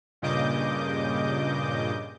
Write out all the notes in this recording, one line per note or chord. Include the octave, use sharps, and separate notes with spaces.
G2 A#2 C#3 D#5 D6 G6